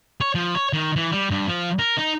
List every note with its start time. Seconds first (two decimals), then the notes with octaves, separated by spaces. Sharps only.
0.21 C#5
0.35 F3
0.55 C#5
0.73 D#3
0.96 E3
1.12 G3
1.31 G2
1.48 F3
1.79 A#4
1.97 D#4